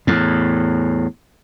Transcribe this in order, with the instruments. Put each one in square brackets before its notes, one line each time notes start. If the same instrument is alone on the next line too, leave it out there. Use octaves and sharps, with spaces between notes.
[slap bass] E2 A2